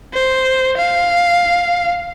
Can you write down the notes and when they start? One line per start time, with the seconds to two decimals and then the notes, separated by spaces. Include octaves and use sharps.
0.14 C5
0.77 F5